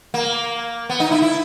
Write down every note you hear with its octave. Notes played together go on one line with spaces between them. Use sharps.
A#3
B3
D#4
E4
E4